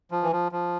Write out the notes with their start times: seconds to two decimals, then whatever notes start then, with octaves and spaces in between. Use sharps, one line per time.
0.11 F3
0.23 E3
0.32 F3
0.52 F3